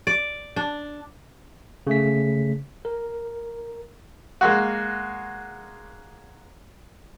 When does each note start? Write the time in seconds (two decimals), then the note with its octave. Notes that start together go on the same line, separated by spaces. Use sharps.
0.07 D5
0.56 D4
1.87 C#3 A3 B6
2.85 A#4
4.41 G#3 A#3 F#4